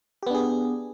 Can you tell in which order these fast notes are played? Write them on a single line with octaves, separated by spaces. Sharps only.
G4 B3 D4 G#4